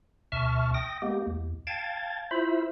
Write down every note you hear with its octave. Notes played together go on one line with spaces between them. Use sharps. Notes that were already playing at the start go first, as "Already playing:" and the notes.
D2 B2 E5 A5 C#6 F6
G5 D#6 A#6
G#3 A#3 B3 G4
E2
F5 G5 A5 G#6 A6
E4 F4 C5 E5 B5